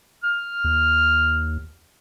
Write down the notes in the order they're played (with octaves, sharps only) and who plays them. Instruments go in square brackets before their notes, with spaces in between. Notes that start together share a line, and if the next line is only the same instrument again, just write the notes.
[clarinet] F6
[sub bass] D#2